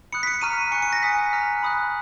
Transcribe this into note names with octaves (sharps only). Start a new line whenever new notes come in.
B5 D#6 F#6 C#7
B6
C#7
A#5 C#6 F6 D#7
G#5 C#6 F#6 C#7
C#7
A#6
G#5 D#6 F#6 B6
A#5 F6
B5 D#6 F#6